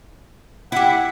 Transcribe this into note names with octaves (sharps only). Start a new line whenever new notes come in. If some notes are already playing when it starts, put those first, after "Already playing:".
E4 G4 E5 F#5